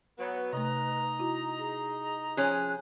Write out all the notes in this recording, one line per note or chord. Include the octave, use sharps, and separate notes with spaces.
F#3 B3 B4
C3 A3 D#4 D#5 A#5
E4 F#4
G#4
F3 C#4 G#4 F#6